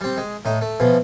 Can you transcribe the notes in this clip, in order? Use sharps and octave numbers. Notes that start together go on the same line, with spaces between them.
G3 C4
G#3
A2 D#4
A3
B2 E3 F3